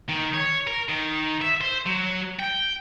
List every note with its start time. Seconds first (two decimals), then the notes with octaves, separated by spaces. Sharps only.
0.09 D#3
0.34 C#5
0.67 A#4
0.89 D#3
1.41 E5
1.61 C5
1.86 F#3
2.39 G5